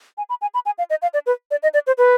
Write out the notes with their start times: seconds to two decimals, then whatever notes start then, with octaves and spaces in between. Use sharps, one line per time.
0.18 G#5
0.30 B5
0.42 G#5
0.54 B5
0.66 G#5
0.78 F5
0.90 D#5
1.02 F5
1.14 D5
1.26 B4
1.51 D5
1.63 D#5
1.74 D5
1.87 C5
1.98 B4